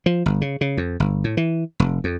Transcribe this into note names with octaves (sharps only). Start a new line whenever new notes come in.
F3
G1
C#3
C#3
F2
G1
A2
E3
F1
F2